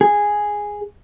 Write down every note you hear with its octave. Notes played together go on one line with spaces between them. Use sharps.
G#4